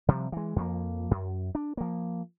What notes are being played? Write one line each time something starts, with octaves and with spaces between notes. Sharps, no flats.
C3 F3 G3
E3 G#3
F2 F3 A#3
F#2
D4
F3 A#3